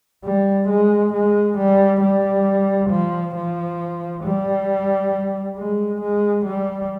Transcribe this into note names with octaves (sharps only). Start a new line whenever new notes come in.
G3
G#3
G#3
G3
G3
F3
F3
G3
G#3
G#3
G3